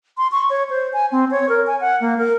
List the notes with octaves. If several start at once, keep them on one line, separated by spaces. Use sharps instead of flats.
C6
C#6
C#5
C5
G#5
C4
C#5
A#4
G#5
F#5
A#3
A#4